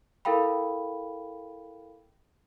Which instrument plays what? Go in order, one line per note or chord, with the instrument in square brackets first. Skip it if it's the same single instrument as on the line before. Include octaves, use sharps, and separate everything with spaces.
[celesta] E4 A4 A#4 F5 G5 B5